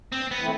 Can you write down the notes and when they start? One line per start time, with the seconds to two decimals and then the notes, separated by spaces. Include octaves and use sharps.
0.12 G2 C4
0.31 B3
0.40 E3 A3 C4 E4